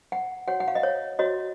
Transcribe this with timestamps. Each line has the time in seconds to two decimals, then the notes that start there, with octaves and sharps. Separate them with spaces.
0.12 F#5
0.48 F#4 C#5 F#5
0.60 F#5
0.68 F5
0.75 D#5
0.83 C#5
1.19 F#4 C#5 D#5